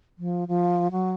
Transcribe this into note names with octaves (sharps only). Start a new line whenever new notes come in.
F3
F3
F#3